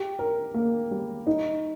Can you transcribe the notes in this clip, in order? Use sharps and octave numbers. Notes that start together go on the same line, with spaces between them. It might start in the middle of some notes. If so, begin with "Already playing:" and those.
Already playing: G4
A#4
A#3
G3
D#4